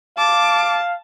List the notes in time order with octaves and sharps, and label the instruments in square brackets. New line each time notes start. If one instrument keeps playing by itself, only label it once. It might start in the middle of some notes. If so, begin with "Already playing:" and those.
[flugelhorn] F5 [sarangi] A5 [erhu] D6